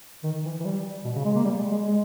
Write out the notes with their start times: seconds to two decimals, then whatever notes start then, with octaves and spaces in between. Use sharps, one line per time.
0.23 D#3
0.45 E3
0.60 E3
0.65 G3
1.04 B2
1.15 C#3
1.25 G#3
1.35 A#3
1.44 G3
1.58 G#3
1.72 G#3
1.86 G#3